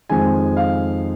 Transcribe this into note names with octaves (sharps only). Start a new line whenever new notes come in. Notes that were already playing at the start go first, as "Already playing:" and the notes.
F2 D#3 G#3 G#5
F5